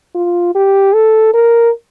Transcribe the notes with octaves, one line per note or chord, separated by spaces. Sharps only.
F4
G4
A4
A#4